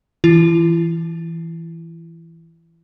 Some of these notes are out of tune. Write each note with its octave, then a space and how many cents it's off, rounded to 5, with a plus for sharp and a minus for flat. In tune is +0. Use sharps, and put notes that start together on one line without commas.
E3 +0 E4 +40